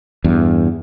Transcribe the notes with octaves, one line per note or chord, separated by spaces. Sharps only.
E2 G2